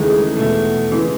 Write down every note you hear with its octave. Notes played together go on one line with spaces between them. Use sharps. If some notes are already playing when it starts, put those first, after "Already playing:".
Already playing: D#2 C#3 E3 G#3 A3 D#4
E2 B2 A3
C#3 E3 G#3